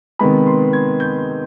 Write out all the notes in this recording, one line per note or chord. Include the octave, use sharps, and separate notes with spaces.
C3 D#3 G#3 B3 B5
C6
G#6
G6